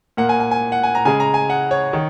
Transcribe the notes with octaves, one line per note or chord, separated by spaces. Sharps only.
A#2 A#3 F#5
G#5
G#5
G#5
F#5
G#5
A#5
C#3 G#3 G#5
A#5
G#5
F#5
C#5
D#3